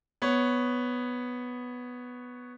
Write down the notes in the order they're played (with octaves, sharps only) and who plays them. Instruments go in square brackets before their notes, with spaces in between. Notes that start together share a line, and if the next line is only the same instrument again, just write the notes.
[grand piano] B3 C#5